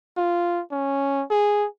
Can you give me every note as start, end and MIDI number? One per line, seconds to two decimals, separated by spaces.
0.17 0.62 65
0.72 1.23 61
1.31 1.67 68